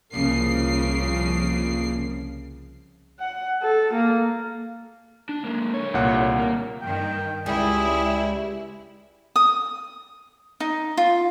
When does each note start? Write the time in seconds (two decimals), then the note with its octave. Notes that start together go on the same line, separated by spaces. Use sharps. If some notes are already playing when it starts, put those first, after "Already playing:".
0.13 C2 C#3 F3 A#3 C7
3.19 F#5
3.63 A4
3.94 A#3
5.29 D4
5.45 G#3 A#3
5.74 D3 C#5
5.94 C2 A#2 F#5
6.39 A#3
6.81 G2 D#3 G5
7.46 C#2 G3 E4 G#4
9.36 D#6
10.60 D#4
10.97 F4